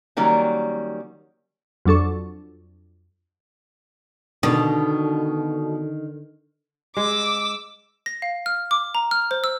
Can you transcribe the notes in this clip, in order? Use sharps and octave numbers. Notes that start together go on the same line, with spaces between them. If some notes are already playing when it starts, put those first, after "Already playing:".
D#3 F#3 G3 A#3 C#4
F2 F#3 D4 A4 C#6
B2 D3 D#3 D4
G#3 D6 E6
A#6
F5
F6
D6
A#5
F6
C5
E6